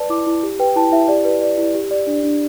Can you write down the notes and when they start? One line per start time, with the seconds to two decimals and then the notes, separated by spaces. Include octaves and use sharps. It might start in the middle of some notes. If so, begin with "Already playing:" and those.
Already playing: B4 D5 A5
0.10 E4 D6
0.27 E4
0.43 G4
0.60 B4 G5
0.76 E4 A5
0.92 E4 E5
1.08 G4 D5
1.25 B4
1.41 D5
1.58 E4
1.74 G4
1.91 D5
2.07 D4
2.24 D4